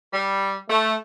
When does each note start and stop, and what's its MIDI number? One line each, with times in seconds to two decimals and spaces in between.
0.14 0.55 55
0.70 0.95 57